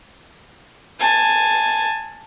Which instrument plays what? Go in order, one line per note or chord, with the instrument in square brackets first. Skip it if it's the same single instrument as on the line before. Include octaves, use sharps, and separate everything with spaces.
[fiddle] G#5 A5